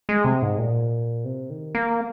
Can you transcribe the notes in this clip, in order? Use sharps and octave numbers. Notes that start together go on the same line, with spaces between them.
G#3
C3
G#2
A#2
C3
D#3
A#3